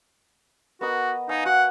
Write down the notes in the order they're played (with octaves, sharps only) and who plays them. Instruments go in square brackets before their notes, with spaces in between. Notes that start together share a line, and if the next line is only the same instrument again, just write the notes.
[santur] B3 A#4 D#5 [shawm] F#4
[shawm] D#4 [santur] F5 G#5 C#6
[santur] F#4 [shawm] F#5